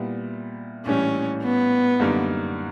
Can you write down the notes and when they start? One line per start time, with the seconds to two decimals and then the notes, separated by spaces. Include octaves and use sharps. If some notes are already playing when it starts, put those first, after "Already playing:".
Already playing: A#2 G3 B3 E4
0.86 A#1 A2 E3 G3 C#4
1.43 B3
2.00 F#2 D3 G3 A#3 D#4